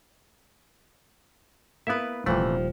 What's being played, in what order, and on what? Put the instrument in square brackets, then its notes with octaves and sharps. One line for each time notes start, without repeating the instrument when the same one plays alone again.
[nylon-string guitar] A#3 B4 [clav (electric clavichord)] B3 E4 E5
[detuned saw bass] D#1 [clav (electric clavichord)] C3 E3 A3 [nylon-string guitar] F3 G3